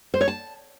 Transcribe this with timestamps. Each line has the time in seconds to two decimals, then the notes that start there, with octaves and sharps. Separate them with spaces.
0.14 C5
0.21 C#5
0.28 A5